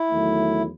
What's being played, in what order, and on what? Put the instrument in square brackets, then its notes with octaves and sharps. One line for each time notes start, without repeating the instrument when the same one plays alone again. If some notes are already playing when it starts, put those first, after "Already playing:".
Already playing: [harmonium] E4
[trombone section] E2 D#3 F#3 A3